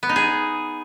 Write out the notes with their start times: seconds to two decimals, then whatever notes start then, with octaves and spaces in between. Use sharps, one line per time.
0.03 B3
0.09 D#4
0.16 G#4